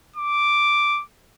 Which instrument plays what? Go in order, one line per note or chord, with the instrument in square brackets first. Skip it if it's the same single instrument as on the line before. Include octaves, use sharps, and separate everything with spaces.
[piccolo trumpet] D6